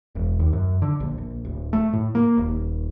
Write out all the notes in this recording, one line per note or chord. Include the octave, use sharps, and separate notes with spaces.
E1
D#2
F#2
D3
A#1
A#1
D1
A3
A2
A#3
D#1